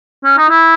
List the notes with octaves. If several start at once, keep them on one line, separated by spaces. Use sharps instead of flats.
C#4
D#4
E4